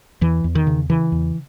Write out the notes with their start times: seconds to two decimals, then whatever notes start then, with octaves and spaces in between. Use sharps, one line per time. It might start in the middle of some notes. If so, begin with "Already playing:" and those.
0.21 E2 E3
0.44 E2
0.55 D#3
0.67 C#3
0.90 C#3 E3
1.12 E2